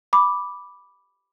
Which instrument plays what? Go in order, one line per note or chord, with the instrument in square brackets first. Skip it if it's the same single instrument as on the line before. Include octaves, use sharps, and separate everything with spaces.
[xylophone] B5 D6